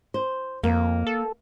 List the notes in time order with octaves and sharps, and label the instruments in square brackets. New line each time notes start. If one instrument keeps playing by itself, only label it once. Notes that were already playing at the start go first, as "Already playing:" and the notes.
[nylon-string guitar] C5
[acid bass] F2 [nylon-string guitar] A#3
[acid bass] A4